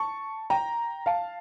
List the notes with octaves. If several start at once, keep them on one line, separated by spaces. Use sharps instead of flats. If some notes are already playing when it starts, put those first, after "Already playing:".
Already playing: A5 C#6
G5 A#5
F5 A5